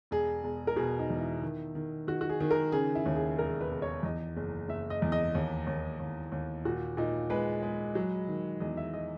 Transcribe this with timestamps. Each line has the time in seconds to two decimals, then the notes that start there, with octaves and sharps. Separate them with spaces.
0.11 E1 G#4
0.44 E1
0.67 A#4
0.76 B2 G#4
0.99 D#4
1.10 E2
1.20 E4
1.42 D#3
1.75 D#3
2.07 D#3 F#4
2.21 F#4
2.29 G#4
2.40 D#3
2.51 A#4
2.72 C#3 G#4
2.95 E4
3.06 D#2
3.16 G#4
3.38 E1 A#4
3.61 B4
3.71 E1
3.82 C#5
4.03 E2 D#5
4.37 F#1
4.68 F#1 E5
4.90 D#5
5.02 E2
5.12 D#5
5.35 D#2
5.67 D#2
6.00 D#2
6.32 D#2
6.65 A#2 F#4
6.97 A#2 D#4
7.30 G#3 B4
7.63 G#3
7.95 F#3
8.28 D#3
8.60 E2 D#5
8.77 E5
8.94 D#5